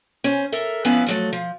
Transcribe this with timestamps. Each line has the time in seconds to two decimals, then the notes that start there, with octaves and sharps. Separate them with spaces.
0.24 C#4 C5
0.52 A4 A#4 E5
0.85 F3 B3 C#4 E4 B4 F5
1.07 F3 F#3 A3
1.33 F3